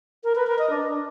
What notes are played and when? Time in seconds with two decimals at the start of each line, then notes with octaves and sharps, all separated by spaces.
0.24 A#4
0.35 B4
0.47 A#4
0.58 D#5
0.70 D4